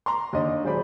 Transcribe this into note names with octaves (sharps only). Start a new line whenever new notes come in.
A#5 C6
D#2 D4 C#5 D#5
D#1 F#3 G#4 C5 D5 B5